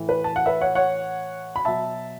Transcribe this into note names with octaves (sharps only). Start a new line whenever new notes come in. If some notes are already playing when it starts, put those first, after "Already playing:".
Already playing: A2 E3
B4
A5
F#5
B4 E5
C#5 F#5
C#5 F#5
B5
B2 F#3 E5 A5